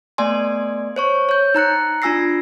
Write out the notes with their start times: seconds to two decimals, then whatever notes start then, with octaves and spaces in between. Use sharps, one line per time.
0.18 A3 B3 D5 G#5 C6
0.96 C5 C#5 C#6
1.29 C#5 G6
1.55 D#4 A#5 F#6 C#7
2.02 D4 F4 G#5 E6 A#6 C7